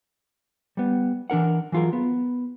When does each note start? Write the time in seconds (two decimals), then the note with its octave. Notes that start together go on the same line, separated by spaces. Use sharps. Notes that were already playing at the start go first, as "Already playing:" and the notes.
0.77 G3 B3
1.30 E3 D4 A#4 F#5
1.72 E3 F#3 F4 G#4 A#4
1.93 B3